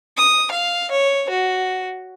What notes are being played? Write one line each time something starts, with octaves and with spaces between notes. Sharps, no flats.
D#6
F5
C#5
F#4